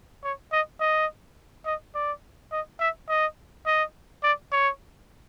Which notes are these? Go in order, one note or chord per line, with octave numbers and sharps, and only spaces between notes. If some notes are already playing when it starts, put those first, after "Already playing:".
C#5
D#5
D#5
D#5
D5
D#5
E5
D#5
D#5
D5
C#5